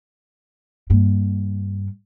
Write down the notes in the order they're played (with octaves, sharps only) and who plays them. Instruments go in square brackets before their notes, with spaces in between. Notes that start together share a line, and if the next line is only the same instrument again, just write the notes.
[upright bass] G2 A#3